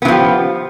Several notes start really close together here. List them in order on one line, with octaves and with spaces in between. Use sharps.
B3 E3 F3 G4